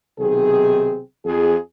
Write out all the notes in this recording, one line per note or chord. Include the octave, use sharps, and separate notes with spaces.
B1 C3 D#3 C4 G#4
F2 G#4